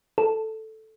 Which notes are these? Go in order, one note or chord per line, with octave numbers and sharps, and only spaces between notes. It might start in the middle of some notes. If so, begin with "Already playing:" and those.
A4